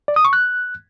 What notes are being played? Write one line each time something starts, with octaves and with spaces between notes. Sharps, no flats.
D5
D#6
C#6
F#6